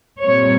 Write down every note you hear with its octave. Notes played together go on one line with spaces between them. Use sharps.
A#2 G3 C4 C#5